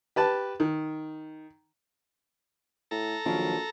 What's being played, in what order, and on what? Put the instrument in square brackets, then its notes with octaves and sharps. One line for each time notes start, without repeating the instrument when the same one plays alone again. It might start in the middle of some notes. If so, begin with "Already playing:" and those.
[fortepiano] G4 B4 A5
D#3
[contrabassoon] A2 [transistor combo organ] A4 A#5
[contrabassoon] A#1 [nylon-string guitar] D#3 F3 F#3